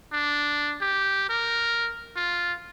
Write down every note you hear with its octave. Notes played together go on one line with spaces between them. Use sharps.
D4
G4
A#4
F4